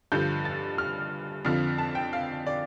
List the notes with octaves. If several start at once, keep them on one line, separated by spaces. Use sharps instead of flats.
G2 D3 F3 G6
A6
F6
F2 D3 F3 F6
A5
G5
F5
D5